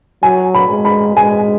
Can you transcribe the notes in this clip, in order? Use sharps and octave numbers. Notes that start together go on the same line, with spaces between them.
F#3 G#5
B5
G#3
B5
G#3 G#5